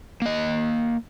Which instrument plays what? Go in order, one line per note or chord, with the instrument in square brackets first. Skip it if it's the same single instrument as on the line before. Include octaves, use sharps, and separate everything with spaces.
[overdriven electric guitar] A#3 D#5